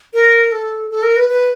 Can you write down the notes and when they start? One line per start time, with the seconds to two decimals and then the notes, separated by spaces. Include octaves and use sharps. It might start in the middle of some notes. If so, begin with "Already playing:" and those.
0.14 A#4
0.52 A4
0.91 A4
1.03 A#4
1.17 B4
1.30 B4